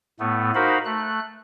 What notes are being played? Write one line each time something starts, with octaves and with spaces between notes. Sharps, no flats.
A2 A3 B3
D#4 F#4 A#4 C5 F5 B5
A3 F#6